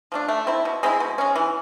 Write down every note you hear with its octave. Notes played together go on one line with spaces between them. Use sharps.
F3 A3 D4
A3
C4 E4
B2
G#3 C4 E4
B2
G#3 C#4
E3